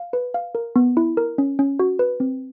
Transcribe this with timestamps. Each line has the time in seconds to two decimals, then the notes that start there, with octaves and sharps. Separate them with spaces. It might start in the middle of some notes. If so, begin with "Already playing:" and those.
Already playing: F5
0.13 B4
0.34 F5
0.55 A#4
0.76 B3
0.97 E4
1.17 A#4
1.38 C#4
1.59 C#4
1.80 F#4
1.99 B4
2.20 C4